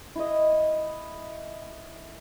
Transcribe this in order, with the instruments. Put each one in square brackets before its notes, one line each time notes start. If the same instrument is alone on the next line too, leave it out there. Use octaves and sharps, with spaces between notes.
[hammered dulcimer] E4 D#5